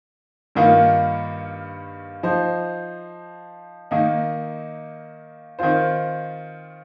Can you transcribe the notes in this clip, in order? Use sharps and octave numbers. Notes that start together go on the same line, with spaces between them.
G2 D#3 A#3 F4
F3 D#4 C5
D#3 A#3 D#4
D#3 C4 F4 C5